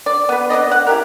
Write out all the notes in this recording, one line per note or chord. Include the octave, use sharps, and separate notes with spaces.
D5
B3 B4
B3 C4 D5 D#5
F#5
E4 G4 A#4